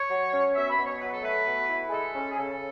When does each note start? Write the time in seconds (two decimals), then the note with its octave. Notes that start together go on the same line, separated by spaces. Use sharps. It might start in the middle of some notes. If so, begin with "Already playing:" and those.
Already playing: C#5
0.10 F#3
0.32 C#4
0.55 B2 E5
0.70 B5
0.78 B2
0.85 C#5
1.01 F#3 B4
1.13 A4
1.23 A3 B4
1.46 B2
1.69 E4
1.88 G#4
1.92 G#3 A4
2.15 C#4
2.31 G#4
2.37 C#3 A4